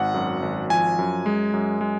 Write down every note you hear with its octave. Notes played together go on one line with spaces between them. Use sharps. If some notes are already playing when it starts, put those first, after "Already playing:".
Already playing: G#1 F#5
F#2
G#1
F3 G#5
F#2
G#3
F#2
G#3